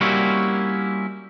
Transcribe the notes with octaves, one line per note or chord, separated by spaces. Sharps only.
G3 A#3 C4 C#4 E4 F#4